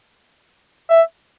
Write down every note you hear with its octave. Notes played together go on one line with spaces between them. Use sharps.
E5